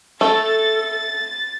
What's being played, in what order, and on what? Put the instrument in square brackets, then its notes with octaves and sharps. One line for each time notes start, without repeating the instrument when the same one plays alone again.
[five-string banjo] A3 [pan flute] A4 [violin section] A6